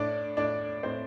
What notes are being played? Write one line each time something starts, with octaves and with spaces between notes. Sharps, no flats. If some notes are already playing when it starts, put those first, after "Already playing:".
Already playing: A2 D4 D5
A2 D4 D5
A2 C4 C5